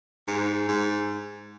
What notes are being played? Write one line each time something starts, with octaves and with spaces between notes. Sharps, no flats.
G#2
G#2